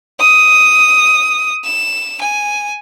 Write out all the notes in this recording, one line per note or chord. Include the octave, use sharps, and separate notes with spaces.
D#6
E7
G#5